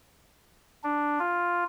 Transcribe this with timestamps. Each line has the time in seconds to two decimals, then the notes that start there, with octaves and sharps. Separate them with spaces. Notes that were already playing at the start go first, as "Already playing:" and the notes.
0.84 D4
1.19 F4